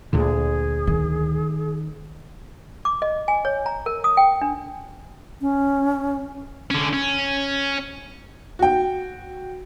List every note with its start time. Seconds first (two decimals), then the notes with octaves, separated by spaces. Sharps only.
0.13 D2 A#2 D3 G#4
0.87 D#3
2.85 D6
3.02 D#5
3.28 G#5
3.45 C#5
3.66 A#5
3.86 A#4
4.04 D#6
4.17 G5
4.41 D4
5.41 C#4
6.71 D3 C#4
6.93 C#4
8.59 F#4 G5